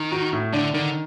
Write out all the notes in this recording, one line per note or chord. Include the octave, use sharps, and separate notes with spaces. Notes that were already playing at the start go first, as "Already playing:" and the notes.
Already playing: D#3
F#4
A2
D3 D4
D3 D#3